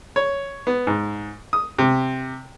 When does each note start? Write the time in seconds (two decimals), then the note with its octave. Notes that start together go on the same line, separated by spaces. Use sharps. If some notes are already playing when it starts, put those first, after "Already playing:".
0.16 C#5
0.67 B3
0.87 G#2
1.53 D#6
1.79 C3